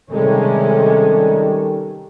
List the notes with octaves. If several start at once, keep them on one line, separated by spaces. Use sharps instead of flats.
C3 D#3 G3 G#3 C#4 A4